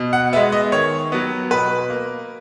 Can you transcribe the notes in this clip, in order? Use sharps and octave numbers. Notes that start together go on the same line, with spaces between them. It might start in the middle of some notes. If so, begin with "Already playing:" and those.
Already playing: B2
F#5
G#3 B3 E5
D#5
D#3 C#5
F#3 B3
B2 B4
A#3